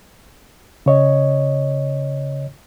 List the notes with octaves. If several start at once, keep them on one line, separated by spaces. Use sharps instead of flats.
C#3 C#5 D#5